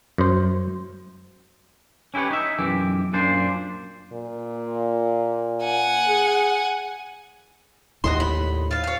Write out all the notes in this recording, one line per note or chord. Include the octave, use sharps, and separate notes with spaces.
F#2 C5
C#4 E4 G4 B4 C#5
D#4 E5
B1 F#2 E3 G4
F#2 A#2 D4 C5
A#2
F#5 G#5
G#4
D#2 A2 F#4 D#5 C6
B5
F4 F5
C#5 F5